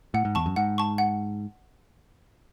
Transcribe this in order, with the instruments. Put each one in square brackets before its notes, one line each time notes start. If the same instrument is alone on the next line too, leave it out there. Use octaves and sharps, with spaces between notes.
[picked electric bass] A2 [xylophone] F#5
[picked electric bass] G#2
[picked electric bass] E2 [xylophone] A5 C#6
[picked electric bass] F#2
[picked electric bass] G#2 [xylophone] F#5
[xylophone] A5 C#6
F#5